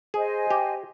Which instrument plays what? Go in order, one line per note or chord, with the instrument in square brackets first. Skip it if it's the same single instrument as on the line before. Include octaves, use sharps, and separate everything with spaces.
[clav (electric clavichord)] G#4 [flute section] C5 D#5 G#5
[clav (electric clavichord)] G4